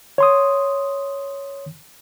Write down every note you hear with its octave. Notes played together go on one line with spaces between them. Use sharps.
C#5 C6 D#6